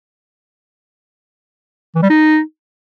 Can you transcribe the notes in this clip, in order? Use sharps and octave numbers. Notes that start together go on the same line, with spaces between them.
E3
G3
D#4